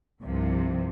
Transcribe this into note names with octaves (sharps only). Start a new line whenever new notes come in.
C2 G2 C3 F3